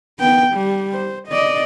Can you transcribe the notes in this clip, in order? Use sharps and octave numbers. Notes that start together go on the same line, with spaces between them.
B3 G5
G3
C5
D5 D#5